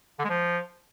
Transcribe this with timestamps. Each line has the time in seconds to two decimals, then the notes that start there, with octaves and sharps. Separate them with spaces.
0.19 D3
0.24 G#3
0.30 F3